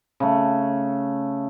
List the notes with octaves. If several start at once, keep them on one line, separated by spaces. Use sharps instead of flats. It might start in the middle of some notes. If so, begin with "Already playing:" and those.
C#3 A3